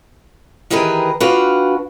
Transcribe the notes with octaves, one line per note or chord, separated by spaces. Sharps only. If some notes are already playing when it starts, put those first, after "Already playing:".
D#3 E3 G4 G#4 A#4 B4
D4 F4 F#4 B4 F5 G5